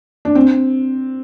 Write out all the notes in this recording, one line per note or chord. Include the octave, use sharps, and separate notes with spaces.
D4
C4